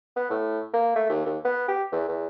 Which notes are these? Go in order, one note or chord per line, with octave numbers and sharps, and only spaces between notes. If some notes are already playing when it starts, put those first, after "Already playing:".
B3
A2
A#3
A3
D#2
D#2
B3
G4
E2
E2